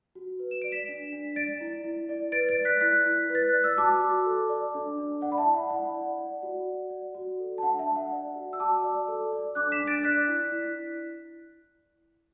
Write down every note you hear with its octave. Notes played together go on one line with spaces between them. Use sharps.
F#4
B4
E7
D5 D7
B6 E7
D4
D4
D5 A6 D7
E4
E4
D5
B4 A6 D7
A6 D7
D5
F#6 B6
E4 F#6 B6
E4
B4
A6
D5 F#6
E6
F#4 A5 D6
F#4
A4
D5
D4
D4
D5 F#5
B5
E5 A5
E4
F#5
E4 F#5
D5
D5
F#4
F#4
D5
F#4
A4
A5
D4 F#5
E5 A5
D4
F#5
D5
F#4
E6
F#4 A5 D6
D5
A4
D5
D4 D6 F#6
B6 E7
D4
A6 D7
D5 F#6 B6
E4
E4